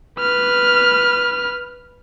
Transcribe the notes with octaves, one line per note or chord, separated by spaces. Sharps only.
B4 F6